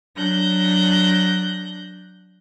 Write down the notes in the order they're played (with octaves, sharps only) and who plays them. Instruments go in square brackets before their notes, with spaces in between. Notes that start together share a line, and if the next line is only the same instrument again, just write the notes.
[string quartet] F#3 D4 F#6 G6 A#6